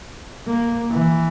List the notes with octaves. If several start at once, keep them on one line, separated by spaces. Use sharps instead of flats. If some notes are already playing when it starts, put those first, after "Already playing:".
A#3
E3